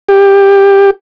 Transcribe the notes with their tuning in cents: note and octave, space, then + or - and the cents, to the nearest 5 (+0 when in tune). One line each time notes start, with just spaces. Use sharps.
G4 +15